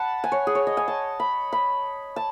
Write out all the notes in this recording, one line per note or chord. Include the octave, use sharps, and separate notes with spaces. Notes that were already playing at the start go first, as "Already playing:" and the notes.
Already playing: F#5 A5 B5
G#5
C#5
G#4
C#5
D#5
G#5
A5
B5
B5
A5